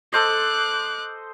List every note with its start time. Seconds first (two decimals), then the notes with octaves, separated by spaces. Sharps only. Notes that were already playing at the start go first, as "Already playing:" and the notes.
0.13 A4 C5 D#5 D6 F#6